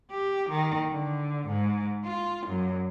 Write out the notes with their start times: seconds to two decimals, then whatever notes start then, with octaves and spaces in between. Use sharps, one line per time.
0.11 G4
0.50 D#3
0.91 D3
1.48 G#2
2.05 F4
2.47 F#2